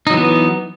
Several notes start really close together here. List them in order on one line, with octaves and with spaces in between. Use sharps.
D#4 F#3 E3 B3